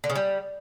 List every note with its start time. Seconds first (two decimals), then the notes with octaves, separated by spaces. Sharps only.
0.04 D3
0.10 C#3
0.15 G3